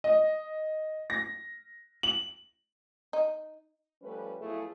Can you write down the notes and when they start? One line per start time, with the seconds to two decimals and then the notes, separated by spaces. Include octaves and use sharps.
0.04 D#5
1.10 A#6
2.03 F#7
3.13 D#4
4.02 F3 G3 A3 C#4 B4
4.40 F#2 B2 F3 A3 E4 G#4